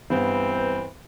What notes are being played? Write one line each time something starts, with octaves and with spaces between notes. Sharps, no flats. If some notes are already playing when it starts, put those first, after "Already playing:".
G2 E3 B3 C4